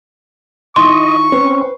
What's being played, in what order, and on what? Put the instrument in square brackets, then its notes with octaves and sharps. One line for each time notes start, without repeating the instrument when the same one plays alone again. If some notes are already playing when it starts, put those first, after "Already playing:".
[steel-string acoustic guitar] D#3 E4 F4 [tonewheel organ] D#5 [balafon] C6 [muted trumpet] C#6
[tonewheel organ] C4 C#4 [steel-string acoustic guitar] B4 C5